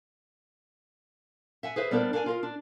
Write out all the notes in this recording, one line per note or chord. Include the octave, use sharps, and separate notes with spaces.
E5 F#5 G#5
G#4 B4 C5 E5
G3 B3 D4 A#4 C5 D5
D4 A#4 F5 G#5
F4 A#4 D#5
D4